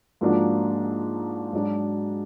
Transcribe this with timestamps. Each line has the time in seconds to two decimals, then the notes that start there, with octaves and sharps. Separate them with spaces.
0.21 G#2 F3 A#3 D4 F#4
1.53 G#2 F#3 D4 F#4